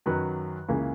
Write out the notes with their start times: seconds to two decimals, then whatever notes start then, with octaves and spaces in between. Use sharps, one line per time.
0.06 F#2 D#3 F#3 B4
0.68 C#2 C#3 E3 A#3